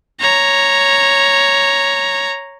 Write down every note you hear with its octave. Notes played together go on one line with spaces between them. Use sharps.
C#5 A#5